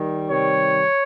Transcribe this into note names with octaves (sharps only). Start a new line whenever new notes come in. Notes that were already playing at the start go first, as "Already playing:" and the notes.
Already playing: D#3 G3
C3 D#3 G3 C#5